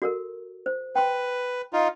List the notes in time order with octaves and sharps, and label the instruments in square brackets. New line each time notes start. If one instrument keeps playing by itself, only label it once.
[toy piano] F#4 A4 A#4
C5
[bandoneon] B4 [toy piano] G5 C6
[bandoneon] D#4 F4